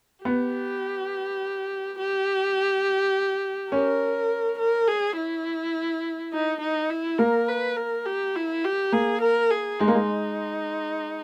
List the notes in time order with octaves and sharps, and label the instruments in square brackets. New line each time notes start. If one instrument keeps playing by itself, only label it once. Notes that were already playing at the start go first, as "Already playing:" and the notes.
[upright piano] B3 [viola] G4
[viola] G4
[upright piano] C#4 [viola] A#4
[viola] A#4
G#4
E4
D#4
D#4
E4
[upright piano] A#3 [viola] A#4
[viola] B4
A#4
G4
E4
G4
[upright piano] A#3 [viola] G#4
[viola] A#4
G#4
[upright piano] G#3 [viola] D#4
[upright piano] A#3
G#3